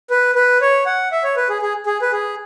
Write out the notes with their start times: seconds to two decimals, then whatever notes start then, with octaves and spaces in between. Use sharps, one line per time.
0.10 B4
0.35 B4
0.61 C#5
0.86 F#5
1.12 E5
1.24 C#5
1.37 B4
1.50 G#4
1.62 G#4
1.86 G#4
2.02 B4
2.12 G#4